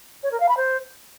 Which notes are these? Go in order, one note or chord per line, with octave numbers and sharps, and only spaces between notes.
C#5
A#4
F5
B5
C5